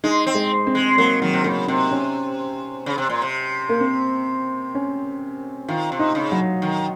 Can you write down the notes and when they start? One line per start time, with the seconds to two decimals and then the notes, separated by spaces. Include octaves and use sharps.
0.04 G#3 D#4
0.27 C4
0.35 G#3
0.67 C4
0.75 G#3
0.98 F#3 A#3
1.22 D#3 F#3
1.33 C3
1.44 C#3 A#3
1.68 C3 C4
1.91 C#4
2.86 C#3
2.98 C3
3.09 A#2
3.22 C3
3.69 A#3
3.81 C4
4.75 C#4
5.68 D#3 F4
5.92 C3
5.99 D#4
6.15 C#3
6.32 F#3
6.62 D#3